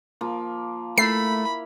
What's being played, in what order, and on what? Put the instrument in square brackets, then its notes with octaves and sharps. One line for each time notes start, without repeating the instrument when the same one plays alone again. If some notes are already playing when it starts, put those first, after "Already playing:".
[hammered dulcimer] F3 A#3
[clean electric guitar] A3 [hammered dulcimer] E4 A#4 [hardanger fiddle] B5 [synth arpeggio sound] C7